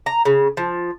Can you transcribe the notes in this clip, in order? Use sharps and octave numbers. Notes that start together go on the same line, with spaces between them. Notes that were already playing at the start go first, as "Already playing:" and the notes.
A#5
C#3
F3